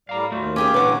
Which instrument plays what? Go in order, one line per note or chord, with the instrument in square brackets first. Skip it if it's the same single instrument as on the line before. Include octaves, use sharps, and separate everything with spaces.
[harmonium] A2 G3 D5 [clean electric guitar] F5 A#5
[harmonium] D#2 F4 [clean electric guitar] A3 F#4
[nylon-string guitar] C#4 G4 G#4 [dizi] D6
[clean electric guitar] A#2 D3 E3 [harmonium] G#3 C#5 [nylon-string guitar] B4 F#5